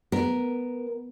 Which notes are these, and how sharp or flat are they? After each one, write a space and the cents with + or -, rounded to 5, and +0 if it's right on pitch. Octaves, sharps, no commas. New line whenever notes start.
B3 +0 A#4 +0